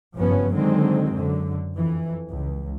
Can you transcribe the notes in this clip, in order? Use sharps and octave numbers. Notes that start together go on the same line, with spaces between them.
F#1 G2 F3 B3 C#4
D3 D#3 F#3 G#3 C4
F#2 D3
F2 E3
C#2